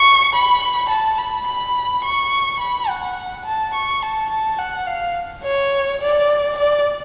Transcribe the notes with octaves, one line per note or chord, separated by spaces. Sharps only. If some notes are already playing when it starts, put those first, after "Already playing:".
Already playing: C#6
B5
A5
B5
B5
C#6
B5
F#5
A5
C#6
A5
A5
F#5
F5
C#5
D5
D5